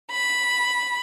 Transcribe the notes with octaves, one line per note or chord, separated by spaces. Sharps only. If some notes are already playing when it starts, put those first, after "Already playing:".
B5